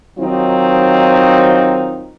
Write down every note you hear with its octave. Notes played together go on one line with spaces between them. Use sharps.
D#3 F#3 C4 D#4 F4